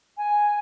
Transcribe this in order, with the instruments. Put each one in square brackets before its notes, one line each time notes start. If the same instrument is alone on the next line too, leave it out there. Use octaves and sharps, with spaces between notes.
[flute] G#5